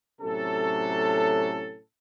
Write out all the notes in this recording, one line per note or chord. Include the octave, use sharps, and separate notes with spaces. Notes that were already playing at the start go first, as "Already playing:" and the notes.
A2 C3 F#3 C#4 A4